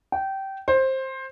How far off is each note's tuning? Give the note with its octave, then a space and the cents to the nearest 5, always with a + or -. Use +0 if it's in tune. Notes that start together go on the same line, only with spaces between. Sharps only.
G5 -20
C5 +15